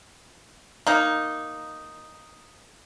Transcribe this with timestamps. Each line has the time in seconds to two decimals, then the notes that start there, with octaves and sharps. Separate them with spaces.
0.87 A#3 D#4